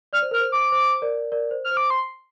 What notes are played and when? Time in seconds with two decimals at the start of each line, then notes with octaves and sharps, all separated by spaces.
0.13 D5 F6
0.22 C5
0.31 A#4 F6
0.40 C5
0.52 D6
0.72 C5
1.02 A#4 D5
1.32 A#4 D5
1.51 C5
1.64 F6
1.71 C5
1.77 D6
1.90 C6